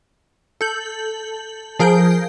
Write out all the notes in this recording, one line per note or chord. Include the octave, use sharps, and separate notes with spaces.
A4 G6 F#7
F3 G#4 A#4 G6 D7